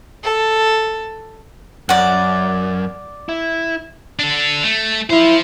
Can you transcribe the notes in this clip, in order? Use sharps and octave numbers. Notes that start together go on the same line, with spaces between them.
A4
F#2 D5 F#5
E4
D4 A4
A3
E4 C5 F5